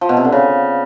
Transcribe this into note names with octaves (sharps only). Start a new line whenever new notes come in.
F3
B2
C3
D3
C#3